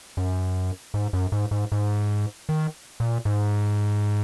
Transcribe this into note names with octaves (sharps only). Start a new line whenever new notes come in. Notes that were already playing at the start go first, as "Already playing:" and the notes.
F#2
G#2
F#2
G#2
G#2
G#2
D#3
A#2
G#2